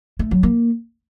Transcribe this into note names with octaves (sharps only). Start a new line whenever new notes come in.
A3
F#3
A#3